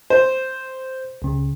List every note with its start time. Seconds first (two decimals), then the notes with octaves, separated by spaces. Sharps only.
0.10 C5
1.22 C#2 C#3